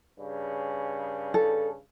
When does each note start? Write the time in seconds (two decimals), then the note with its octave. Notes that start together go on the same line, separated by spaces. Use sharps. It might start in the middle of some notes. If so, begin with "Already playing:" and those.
0.19 G2 C#3
1.34 A4